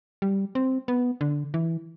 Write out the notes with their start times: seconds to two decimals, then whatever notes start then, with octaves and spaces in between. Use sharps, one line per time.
0.22 G3
0.55 C4
0.88 B3
1.21 D3
1.54 E3